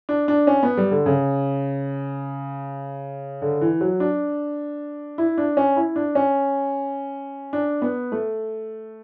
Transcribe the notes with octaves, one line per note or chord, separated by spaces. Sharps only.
D4
D4
C#4
B3
G3
D3
C#3
D3
E3
F#3
D4
E4
D4
C#4
E4
D4
C#4
D4
B3
A3